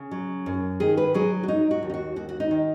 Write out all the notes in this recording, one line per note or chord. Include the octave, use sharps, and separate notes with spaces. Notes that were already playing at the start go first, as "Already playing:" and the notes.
Already playing: C#3
F#3
F#2
D#3 G#4
B4
F#3 G#4
F#4
F#3 D#4
F#4
D#2
D#4
F#4
D#2 F#4
F#4
D#4
D#3